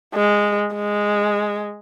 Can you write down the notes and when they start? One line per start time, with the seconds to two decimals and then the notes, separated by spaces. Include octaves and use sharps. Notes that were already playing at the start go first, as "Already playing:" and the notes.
0.15 G#3
0.75 G#3